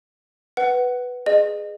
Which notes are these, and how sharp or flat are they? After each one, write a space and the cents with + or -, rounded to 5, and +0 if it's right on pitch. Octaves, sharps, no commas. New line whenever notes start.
B4 +0 F#5 +15
G#4 +0 D#5 -30